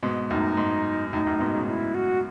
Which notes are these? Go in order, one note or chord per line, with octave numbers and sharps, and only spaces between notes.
G#2 B2
F#2 A2 D#4
G#2
F#2 A2 D#4
F#2 A2
G#2 B2
A2 C#3
E4
F#4